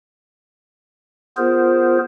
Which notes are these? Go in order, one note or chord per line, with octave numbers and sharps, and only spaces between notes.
B3 F4 G#4 A#4 C5